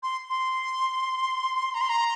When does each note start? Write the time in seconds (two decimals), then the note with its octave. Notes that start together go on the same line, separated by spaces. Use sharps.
0.03 C6
0.30 C6
1.74 A#5
1.81 C6
1.89 A#5